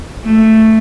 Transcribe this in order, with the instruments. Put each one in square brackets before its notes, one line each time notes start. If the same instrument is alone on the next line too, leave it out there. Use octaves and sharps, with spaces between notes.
[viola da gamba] A3